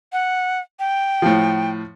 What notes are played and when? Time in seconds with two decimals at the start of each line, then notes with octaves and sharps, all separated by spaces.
0.13 F#5
0.80 G5
1.22 A2 F3